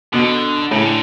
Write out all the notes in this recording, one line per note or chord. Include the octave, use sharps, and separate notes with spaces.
B2 D3
A2 C#3
D3